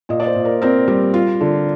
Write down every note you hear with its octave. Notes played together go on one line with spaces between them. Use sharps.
A#2 D#5
D5
C5
A#2
A#4
C4 A#4
G3
F4
D3